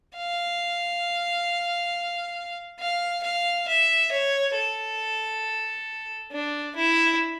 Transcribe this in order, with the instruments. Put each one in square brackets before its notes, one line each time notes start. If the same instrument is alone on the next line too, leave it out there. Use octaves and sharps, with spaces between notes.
[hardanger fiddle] F5
F5
F5
E5
C#5
A4
D4
E4